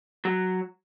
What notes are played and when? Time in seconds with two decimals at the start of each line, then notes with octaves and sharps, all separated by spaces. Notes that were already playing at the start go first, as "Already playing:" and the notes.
0.25 F#3